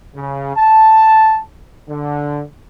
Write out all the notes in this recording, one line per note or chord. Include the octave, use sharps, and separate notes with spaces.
C#3
A5
D3